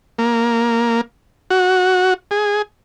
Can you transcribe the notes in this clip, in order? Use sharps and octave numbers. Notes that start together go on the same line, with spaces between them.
A#3
F#4
G#4